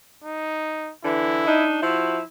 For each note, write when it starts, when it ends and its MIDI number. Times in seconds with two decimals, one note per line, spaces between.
0.24 0.92 63
1.05 1.44 50
1.05 1.44 52
1.05 1.67 64
1.47 1.81 62
1.47 1.81 63
1.83 2.21 53
1.83 2.21 64
1.83 2.17 66